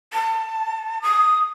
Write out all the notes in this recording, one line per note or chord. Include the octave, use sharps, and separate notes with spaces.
A5
D#6